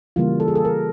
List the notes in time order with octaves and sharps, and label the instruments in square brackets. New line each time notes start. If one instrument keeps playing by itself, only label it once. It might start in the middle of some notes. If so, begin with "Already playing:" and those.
[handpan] C#3 E3 G3 A#3 F4
A4
G#4
A4
A#4